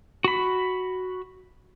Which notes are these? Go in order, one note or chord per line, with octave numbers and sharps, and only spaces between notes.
F#4 B5